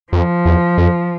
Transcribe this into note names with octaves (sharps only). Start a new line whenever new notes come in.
F2 F3
E2
F2